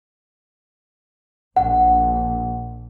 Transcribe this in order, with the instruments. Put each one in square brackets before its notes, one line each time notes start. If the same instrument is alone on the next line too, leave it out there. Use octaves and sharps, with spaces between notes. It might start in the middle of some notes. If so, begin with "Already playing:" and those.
[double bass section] A#1 [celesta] F#5